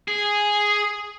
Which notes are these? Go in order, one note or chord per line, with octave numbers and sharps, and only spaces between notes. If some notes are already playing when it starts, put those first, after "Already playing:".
G#4